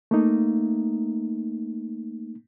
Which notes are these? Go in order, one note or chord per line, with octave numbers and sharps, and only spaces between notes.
A3 A#3 D#4